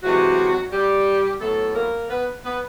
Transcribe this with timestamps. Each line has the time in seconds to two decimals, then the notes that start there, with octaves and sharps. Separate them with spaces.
0.02 C3 E3 F#3 G#3 F#4
0.71 G3 G4
1.40 A2 F#3 A3 B3 A4
1.75 A#3 A#4
2.10 B3 B4
2.44 B3 B4